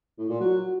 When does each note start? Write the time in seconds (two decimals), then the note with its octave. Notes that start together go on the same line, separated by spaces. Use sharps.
0.19 A2
0.29 A#2
0.40 F#3